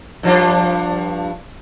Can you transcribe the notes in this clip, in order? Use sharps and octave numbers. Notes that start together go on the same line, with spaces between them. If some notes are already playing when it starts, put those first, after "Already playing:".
G2 F3 D4